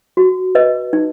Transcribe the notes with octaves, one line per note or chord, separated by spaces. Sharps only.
F#4
B4 D#5
D#4